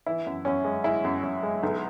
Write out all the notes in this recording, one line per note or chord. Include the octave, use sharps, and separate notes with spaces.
E3 E4
F#2
F#2 C#4
G#3
G#3 E4
F#2
F#2
G#3
B1